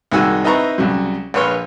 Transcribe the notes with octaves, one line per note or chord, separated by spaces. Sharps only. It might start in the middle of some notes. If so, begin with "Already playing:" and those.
C2 D#3 G#3 F#4 G#5 E6
C4 D#4 E4 B4 A#5 C#6
C2 C#3 F#3
A#1 B4 C#5 C6 F6